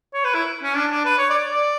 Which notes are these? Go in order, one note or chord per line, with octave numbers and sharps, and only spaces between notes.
C#5
B4
E4
C#4
D4
D4
B4
C#5
D5
D5